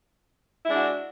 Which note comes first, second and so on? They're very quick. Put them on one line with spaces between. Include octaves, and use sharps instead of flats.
E4 G#3 D4 F#4